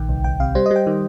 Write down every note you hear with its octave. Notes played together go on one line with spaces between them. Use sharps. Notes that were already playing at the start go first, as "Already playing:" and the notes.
Already playing: A#1 D#3 G5
C2
C2 G5
C3 F5
G3 C5
G3 D#5
G5
D#3